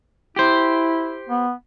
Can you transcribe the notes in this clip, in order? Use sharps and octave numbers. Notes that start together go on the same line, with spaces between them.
E4 G4 C5
B3